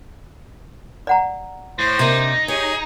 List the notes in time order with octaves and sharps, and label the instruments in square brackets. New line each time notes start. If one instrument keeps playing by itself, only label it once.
[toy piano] D5 F#5 A#5
[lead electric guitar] A2 [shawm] C5
[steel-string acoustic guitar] C3 A#3 D4 [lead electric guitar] D#4
[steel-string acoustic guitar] G4 C#5 [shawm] G#4